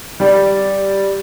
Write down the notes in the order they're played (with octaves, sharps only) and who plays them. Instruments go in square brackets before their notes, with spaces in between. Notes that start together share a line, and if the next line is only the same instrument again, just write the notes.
[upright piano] G3 G4 D5